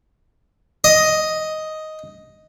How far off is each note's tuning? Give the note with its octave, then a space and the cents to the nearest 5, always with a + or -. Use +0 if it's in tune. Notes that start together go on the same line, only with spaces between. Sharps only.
D#5 +5